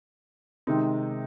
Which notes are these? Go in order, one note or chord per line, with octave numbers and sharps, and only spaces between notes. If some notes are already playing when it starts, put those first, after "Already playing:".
C3 D#3 G#3 C4 D#4